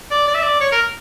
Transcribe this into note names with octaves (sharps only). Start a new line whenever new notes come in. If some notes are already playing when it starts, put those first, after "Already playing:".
D5
D5
E5
D5
C#5
A#4